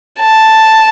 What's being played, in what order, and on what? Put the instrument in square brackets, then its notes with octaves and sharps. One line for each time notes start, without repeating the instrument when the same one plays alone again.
[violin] A5